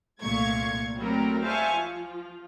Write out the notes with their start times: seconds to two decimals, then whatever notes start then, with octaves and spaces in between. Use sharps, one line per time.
0.22 C2 A#2 A3 F5 C#6 G#6
0.99 F#3 G3 A3 C4 A#4
1.45 C5 E5 F5 G#5 A5 C#6
1.75 F3 F4